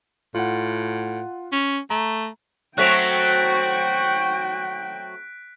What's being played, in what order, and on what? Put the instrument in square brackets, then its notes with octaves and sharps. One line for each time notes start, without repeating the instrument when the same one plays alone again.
[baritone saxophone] A2 [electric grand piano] F4 F#5
[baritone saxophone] C#4
[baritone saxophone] A3 [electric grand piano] A#5
[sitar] F#3 A3 C4 [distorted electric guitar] F#4 [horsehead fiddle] G5 [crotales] F#6 B6 D7